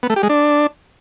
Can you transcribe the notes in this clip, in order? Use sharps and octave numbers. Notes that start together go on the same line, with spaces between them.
B3
A3
G4
G#3
D4